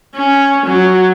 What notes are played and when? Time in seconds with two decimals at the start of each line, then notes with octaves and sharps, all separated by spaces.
0.16 C#4
0.66 F#3